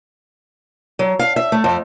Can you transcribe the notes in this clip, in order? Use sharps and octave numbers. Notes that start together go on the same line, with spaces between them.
F#3
F5
E5
A3
F2